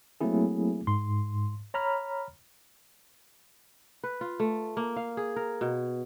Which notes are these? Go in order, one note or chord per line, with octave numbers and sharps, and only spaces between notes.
F#3 A3 A#3 C4 E4 G#4
G#2 C6
C#5 A#5 B5 F6
B4
F4
A3
A#3
F5
G#4
A#4
B2